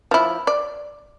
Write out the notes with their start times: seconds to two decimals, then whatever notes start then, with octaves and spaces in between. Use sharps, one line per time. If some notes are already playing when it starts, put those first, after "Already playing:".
0.11 F3 E4
0.47 D5